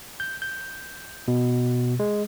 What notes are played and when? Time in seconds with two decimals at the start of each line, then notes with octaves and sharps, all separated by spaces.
0.20 G6
0.42 G6
1.28 B2
2.00 G#3